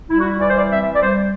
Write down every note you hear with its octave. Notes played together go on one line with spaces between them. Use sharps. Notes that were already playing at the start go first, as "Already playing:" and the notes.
G3 E4
F#4
E4
E3 D5
C5
D5
C4 E5
D5
G3 C5